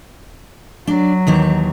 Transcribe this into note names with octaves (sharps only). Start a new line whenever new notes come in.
F#3 D4 D5
D#2 D#3 E3